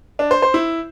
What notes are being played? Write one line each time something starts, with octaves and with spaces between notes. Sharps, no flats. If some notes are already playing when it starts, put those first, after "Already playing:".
D4
C5
C5
E4